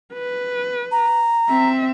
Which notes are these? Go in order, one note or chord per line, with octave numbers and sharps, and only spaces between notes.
B4
A#5
C4 E5